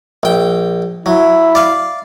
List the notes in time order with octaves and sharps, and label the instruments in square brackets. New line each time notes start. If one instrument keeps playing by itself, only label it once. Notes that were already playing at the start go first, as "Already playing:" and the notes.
[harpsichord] A#1 G5
[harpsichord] F#3 [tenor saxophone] E4
[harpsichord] D5 F5